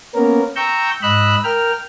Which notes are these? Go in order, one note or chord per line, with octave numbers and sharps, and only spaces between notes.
A#3 B3 C#4 A#4
G5 A#5 C#6 E6 G6
G#2 D#5 B5 E6 F#6
A#4 G5 F6